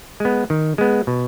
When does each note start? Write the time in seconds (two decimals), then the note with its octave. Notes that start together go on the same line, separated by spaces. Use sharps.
0.20 G#3 B3
0.50 D#3
0.78 G#3 B3
1.07 B2